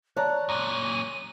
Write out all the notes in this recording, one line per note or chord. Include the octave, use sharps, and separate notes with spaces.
C#5 D5 A5 A#5 F#6
F#2 A#2 A#5 D#7